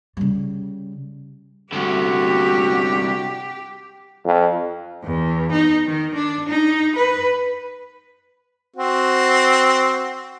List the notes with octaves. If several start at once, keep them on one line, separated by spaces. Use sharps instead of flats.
C#3 G3
C2 D3 F#4 G4
F2
E2
D#4
D#3
D4
D#4
B4
C4 F#4